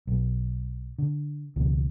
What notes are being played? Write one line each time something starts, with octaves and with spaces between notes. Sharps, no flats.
B1
D3
C#2 B2 E3